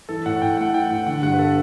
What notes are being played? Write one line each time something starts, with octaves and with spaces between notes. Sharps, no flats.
E3 A4
A2 F#5
A2 G5
A3 F#5
E3 G5
A2 F#5
D3 F#5
G2 F#5
B4
B3 A4